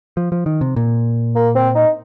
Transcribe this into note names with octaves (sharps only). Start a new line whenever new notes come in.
F3
F3
D#3
C3
A#2
A#3
C4
D#4